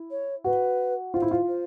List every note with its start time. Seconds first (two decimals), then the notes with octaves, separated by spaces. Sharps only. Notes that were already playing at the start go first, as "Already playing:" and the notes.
Already playing: E4
0.10 C#5
0.44 F#4 B4
1.13 F4 C5
1.22 E4
1.31 F4
1.48 C5